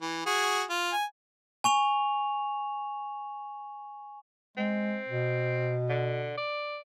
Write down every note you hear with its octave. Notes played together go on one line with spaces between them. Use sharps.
E3
F#4 G#4
F4
G#5
G#5 C#6 F7
G#3 C4
B2
D3
D5